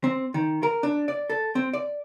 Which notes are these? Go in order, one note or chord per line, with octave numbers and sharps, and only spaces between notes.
C4
D#3
A#4
D4
D5
A4
C4
D5